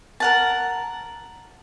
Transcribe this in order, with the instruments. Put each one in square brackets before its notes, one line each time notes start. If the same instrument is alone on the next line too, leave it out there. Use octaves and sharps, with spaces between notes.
[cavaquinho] A#4 F#5 A5